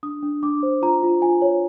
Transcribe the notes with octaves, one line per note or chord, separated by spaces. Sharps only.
D4 D#6
D4
D4 D6
C5
F4 A#5
F4
F4 G#5
C#5